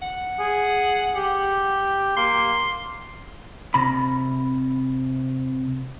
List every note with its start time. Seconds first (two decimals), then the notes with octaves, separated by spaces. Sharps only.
0.02 F#5
0.39 G#4
1.16 G4
2.17 A#3 C6
3.74 C3 B5